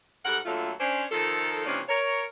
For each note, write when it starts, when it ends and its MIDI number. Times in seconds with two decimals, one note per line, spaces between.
0.25 0.38 44
0.25 0.38 55
0.25 0.38 69
0.25 0.38 70
0.25 0.38 78
0.45 0.71 46
0.45 0.71 50
0.45 0.71 54
0.45 0.71 57
0.45 0.71 65
0.80 1.05 61
0.80 1.05 62
0.80 1.05 72
1.11 1.65 51
1.11 1.65 53
1.11 1.65 63
1.11 1.65 65
1.11 1.65 69
1.66 1.81 48
1.66 1.81 52
1.66 1.81 53
1.66 1.81 58
1.66 1.81 61
1.66 1.81 62
1.89 2.24 70
1.89 2.24 73